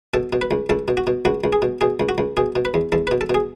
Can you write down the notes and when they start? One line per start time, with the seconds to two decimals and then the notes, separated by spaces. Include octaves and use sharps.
0.14 B2 A4
0.33 B2
0.41 B4
0.51 C#2
0.69 C#2 A4
0.88 B2
0.97 F#4
1.07 B2
1.25 C#2 F#4
1.44 C#2
1.53 G#4
1.62 B2
1.81 B2 G#4
2.00 C#2
2.09 F#4
2.18 C#2
2.37 B2 G#4
2.56 B2
2.65 B4
2.74 E2
2.92 E2 A4
3.07 B4
3.11 B2
3.21 A4
3.30 B2 G#4